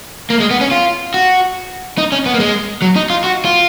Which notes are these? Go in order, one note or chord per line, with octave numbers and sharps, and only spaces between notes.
A#3
G#3
B3
C#4
F4
F#4
D#4
C#4
B3
A#3
G#3
F#3
D#4
F4
F#4
F4